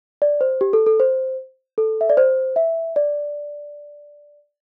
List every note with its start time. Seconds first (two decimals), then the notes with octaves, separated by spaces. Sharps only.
0.22 D5
0.41 C5
0.61 G4
0.73 A4
0.86 A4
1.00 C5
1.78 A4
2.01 E5
2.10 D5
2.17 C5
2.56 E5
2.96 D5